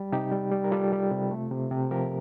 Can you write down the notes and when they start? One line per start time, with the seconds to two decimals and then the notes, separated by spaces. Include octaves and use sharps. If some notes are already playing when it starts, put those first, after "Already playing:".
Already playing: G3
0.12 C3 D#4 G4
0.32 G3
0.52 G3
0.64 A#4
0.71 G3 F4 A4
0.92 G3
1.12 C3
1.31 A3
1.51 C3
1.71 C3
1.91 F3 G4 A#4